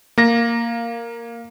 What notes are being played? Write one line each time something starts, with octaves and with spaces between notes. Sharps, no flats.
A#3 A#6